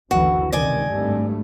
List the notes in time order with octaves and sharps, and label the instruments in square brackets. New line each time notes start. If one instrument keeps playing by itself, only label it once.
[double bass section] F#1 D2 E3 [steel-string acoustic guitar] F#4
[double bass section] C#2 C3 D#3 [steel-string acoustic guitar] D5 D#5 G#5
[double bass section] G#1 G2 A3